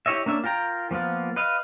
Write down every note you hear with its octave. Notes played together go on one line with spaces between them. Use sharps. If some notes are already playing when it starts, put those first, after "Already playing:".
E4 G4 C#5 D#5 E5
A#3 C#4 D4 E5
F4 A#4 G5 A#5
F3 A#3 B3 F4
B4 D#5 F5